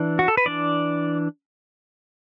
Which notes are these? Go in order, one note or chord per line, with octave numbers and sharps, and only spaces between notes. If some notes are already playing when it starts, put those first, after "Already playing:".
Already playing: E3 D4
F#4
A4
B4
E3 D4 D5